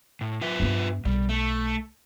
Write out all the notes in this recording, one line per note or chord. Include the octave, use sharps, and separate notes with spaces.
A2
F4 B4 E5
G2 B3
B1 G3
A3